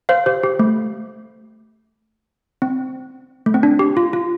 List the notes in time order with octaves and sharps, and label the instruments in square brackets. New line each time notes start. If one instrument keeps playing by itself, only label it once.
[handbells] C5 F5
G4 C5
G4
A3
C4
A3
C4
D4
G4
F4
F4